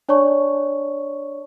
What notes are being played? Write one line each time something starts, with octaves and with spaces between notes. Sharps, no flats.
D4 C#5 D5 A5 C#6